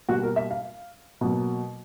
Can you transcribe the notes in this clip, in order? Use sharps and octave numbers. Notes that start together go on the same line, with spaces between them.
B2 G3 A#3 F#4
A#4
E5
F5
B2 F#3 A#3